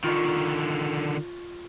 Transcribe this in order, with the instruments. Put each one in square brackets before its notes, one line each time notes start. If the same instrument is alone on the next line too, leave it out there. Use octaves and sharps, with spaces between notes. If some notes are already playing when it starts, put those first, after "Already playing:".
[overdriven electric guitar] D3 D#3 [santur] F4 C#6